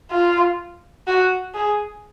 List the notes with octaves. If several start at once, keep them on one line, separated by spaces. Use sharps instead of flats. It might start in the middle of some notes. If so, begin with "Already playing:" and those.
F4
F#4
G#4